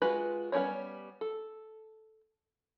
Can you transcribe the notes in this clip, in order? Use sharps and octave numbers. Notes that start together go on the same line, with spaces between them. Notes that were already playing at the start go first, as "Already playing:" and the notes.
G#3 F4 F#4 B4
G3 B3 C#4 G#4 C#5
A4